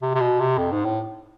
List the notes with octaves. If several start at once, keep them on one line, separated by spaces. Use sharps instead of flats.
C3
C3
B2
C3
F2
G#2
A2